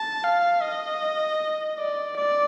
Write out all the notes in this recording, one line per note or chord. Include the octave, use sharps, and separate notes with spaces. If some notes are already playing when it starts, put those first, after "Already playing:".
Already playing: A5
F5
D#5
D5
D5